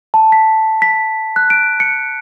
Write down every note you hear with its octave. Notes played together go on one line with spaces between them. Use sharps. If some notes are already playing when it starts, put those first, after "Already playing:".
A5
B6
B6
F#6
D7
C#7